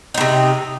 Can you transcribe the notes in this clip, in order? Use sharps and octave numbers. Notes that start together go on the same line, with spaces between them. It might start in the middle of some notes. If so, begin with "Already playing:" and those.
A2 C3 D#4